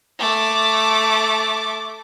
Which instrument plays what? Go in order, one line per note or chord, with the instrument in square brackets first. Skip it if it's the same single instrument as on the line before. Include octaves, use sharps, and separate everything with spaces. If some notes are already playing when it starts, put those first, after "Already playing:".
[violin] A3 D6